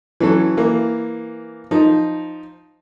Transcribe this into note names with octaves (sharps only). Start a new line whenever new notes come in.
E3 F#3 C#4 A4
E3 A#3
F3 D#4